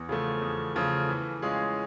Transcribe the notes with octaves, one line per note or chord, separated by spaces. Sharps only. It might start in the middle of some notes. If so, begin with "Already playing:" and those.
Already playing: E2
C#3 F3 A3
E2
C#3 F3 A3
E3
G#3 C#4 F4 G#4